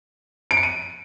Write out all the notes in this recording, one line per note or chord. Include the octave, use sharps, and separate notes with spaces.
D7
C#7
D#7